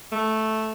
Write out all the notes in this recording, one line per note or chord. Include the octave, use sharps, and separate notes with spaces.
A3